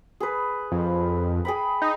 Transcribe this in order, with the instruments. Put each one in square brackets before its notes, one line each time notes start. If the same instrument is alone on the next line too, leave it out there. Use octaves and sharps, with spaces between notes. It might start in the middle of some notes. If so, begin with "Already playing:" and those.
[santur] G#4 B4
[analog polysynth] F2
[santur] G#4 G5 B5
[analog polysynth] D#4